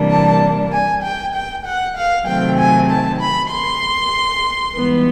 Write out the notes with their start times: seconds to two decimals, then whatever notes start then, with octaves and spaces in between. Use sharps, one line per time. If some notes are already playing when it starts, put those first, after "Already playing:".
Already playing: C3 E3 G3 A#3 D4
0.11 A5
0.73 G#5
1.03 G5
1.34 G5
1.66 F#5
1.97 F5
2.27 C3 D#3 F#3 A3 C4 G5
2.58 G#5
2.90 A5
3.20 B5
3.52 C6
4.75 G#2 E3 G3 B3